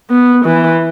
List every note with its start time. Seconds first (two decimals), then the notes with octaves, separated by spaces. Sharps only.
0.11 B3
0.45 E3